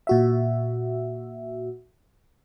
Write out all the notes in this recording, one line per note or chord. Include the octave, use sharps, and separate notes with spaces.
A#2 F#4 E5